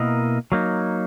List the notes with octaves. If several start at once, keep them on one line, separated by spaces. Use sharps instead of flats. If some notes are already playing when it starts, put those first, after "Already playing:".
Already playing: B2 A#3 E4 A#4 D#5
F#3 A#3 D#4